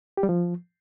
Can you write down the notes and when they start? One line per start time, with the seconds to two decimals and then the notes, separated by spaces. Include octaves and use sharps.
0.17 G4
0.23 G3
0.29 F3